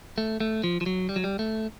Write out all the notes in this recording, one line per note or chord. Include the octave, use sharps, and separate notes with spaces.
A3
A3
F3
F3
F#3
G3
F#3
G3
A3